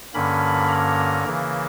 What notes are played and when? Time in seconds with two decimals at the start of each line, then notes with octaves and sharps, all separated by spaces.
0.14 G2 D3 A#3 C#4 B5
0.69 A#5
1.24 C#3 E3 A#3